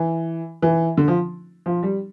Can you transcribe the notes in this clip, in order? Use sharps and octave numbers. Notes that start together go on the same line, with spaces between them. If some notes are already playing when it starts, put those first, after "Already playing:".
Already playing: E3
E3
D3
F3
F3
G3